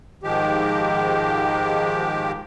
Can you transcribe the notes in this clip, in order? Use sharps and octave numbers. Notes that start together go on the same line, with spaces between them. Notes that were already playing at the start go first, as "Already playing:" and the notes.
G#2 D#3 F3 G#3 G4